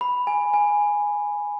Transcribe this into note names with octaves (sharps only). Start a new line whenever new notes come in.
B5
G#5
G#5